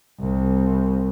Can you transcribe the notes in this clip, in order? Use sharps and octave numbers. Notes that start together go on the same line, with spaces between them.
C2